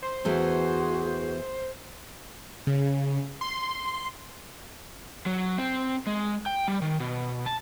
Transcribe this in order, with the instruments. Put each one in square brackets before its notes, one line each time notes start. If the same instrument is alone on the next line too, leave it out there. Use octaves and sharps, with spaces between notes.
[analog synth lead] C5 [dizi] C6
[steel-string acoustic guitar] E2 E3 A3 [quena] F#4 [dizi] G#4 [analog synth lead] C5
[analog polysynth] C#3
C6
[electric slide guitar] F#3
C4
G#3
G5
G3
D#3
B2
A5